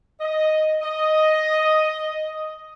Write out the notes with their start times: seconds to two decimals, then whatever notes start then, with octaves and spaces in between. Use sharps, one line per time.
0.20 D#5
0.82 D#5